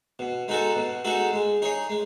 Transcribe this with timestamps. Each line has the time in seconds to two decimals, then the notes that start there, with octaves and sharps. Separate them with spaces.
0.19 B2
0.48 G#3 D#4 F#4 A4
0.76 B2
1.04 G#3 D#4 F#4 A4
1.33 G#3
1.62 D#4 G#4 C#5
1.90 G#3